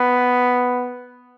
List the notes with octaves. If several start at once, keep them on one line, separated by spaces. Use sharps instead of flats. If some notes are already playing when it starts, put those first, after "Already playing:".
Already playing: B3